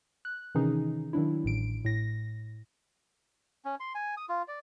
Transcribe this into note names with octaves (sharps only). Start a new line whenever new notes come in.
F#6
C3 D#3 E3 C#4 D#4 G#4
D#3 F#3 D4 E4
A1 A2 D7
A2 A#6
C#4
C6
G#5
D#6
F4
D5